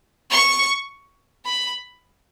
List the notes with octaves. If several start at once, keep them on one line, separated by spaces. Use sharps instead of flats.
C#6
B5